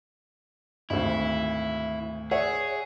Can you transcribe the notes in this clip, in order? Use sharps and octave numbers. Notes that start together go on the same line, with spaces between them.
G#1 D2 E4
G#4 C#5 E5 F#5